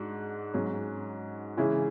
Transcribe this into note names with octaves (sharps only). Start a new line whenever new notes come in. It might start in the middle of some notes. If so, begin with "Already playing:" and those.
Already playing: G#2 G#3 D4 F#4
G#2 F#3 C#4
C#3 E3 G#3 C#4 E4